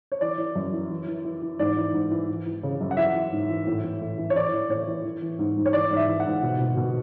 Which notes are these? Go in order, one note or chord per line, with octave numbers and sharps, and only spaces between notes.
C#5
E3 D5
E3
F#2
E3
E3
E3
E3
E3
G#2 D5
E3
G#2
E3
E3
E3
C#3
F#2
F#5
E3 E5
E3
G#2
E3
A2
E3
A2
E3
C#5
E3 D5
E3
A2 C#5
E3
E3
E3
G#2
G#2
C#5
E3 D5
G#2
E5
E3
F#5
G#2
B2
B2
B2